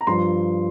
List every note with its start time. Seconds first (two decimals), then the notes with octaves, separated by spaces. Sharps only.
0.01 A#5
0.07 G2 F3 C6